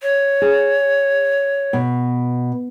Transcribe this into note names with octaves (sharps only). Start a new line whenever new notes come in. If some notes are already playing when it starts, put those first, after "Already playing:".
C#5
G#4
B2